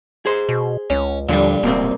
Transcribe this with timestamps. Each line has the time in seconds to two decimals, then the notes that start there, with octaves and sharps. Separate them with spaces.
0.26 G#4 C5
0.49 B2
0.90 C#2 C#4
1.29 D#2 A#2 D3 F3 G3
1.63 D1 B2 A#3 C4